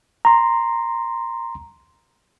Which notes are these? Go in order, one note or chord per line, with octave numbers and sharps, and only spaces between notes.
A#5 C6